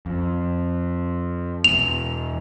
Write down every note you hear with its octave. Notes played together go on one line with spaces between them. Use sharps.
F2
E2 B2 F7